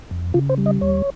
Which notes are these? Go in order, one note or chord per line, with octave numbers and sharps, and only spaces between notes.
F2
C#3 F4
C5
G3
D#5
D#2 C#5